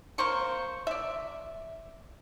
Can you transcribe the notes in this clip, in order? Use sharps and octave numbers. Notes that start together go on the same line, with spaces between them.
A#3 C4 C5 C#6
D5 E5